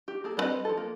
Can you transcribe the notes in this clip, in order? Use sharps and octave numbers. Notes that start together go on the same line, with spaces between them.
G4
A#3 G#4 A4
G3 B3 C4 B4 D#5
F3 A4
A#3